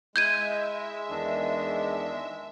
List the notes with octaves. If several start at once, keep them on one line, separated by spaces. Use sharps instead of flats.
G#3 E4 E5 G6 G#6 D#7
E2 D#3 D4